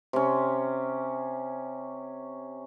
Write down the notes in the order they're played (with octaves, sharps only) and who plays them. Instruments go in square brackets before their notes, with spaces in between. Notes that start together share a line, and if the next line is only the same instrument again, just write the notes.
[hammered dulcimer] C3 C#4